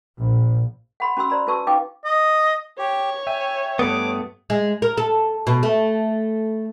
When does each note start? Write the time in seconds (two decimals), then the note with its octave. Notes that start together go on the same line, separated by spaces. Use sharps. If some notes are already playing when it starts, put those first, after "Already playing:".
0.20 A#1
1.00 F#5 B5 C6
1.17 C#4 F#4 B5 C6 E6
1.30 C5 D5 A#5 B5
1.47 E4 F#4 B4 A5 C#6 E6
1.67 D#4 B4 F5 G5 D6
2.05 D#5
2.79 G4 C#5
3.27 E5 G5 G#5
3.79 G2 A3 B3 D6 D#6
4.50 G#3
4.82 A#4
4.97 A4
5.47 B2
5.63 A3